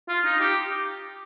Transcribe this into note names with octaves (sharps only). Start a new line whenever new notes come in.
F4
D#4
G4